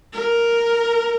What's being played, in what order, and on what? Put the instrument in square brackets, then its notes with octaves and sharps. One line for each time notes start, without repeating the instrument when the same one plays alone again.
[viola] A#4